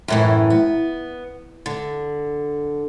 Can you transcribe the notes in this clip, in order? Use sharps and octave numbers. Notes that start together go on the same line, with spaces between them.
F#2 A2 E3
B3
D3